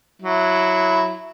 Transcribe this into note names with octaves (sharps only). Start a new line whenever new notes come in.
F#3 E4